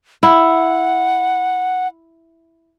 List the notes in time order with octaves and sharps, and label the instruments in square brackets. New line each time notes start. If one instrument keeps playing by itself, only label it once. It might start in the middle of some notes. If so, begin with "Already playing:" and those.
[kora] E4 [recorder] F#5